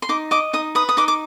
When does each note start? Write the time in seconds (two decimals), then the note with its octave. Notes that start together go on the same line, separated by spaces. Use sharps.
0.02 C6
0.09 D#4 D6
0.31 D#5 D6
0.53 D#4 D#6
0.75 B4 D#6
0.89 D#6
0.97 D#4 D6
1.08 D6